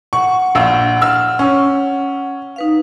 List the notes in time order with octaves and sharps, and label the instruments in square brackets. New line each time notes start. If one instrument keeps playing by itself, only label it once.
[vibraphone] F#5 [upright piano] C#6
[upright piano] A#1 F5 E6
E6 F6
C#4
[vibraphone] D#4 B4 F5